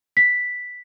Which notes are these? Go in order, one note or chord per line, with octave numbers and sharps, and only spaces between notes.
B6